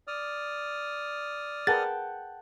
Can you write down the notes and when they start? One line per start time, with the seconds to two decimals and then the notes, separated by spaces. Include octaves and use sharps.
0.07 D5 D#6 F6
1.67 G#4 A#4 B4 F#5 G5 A5 A6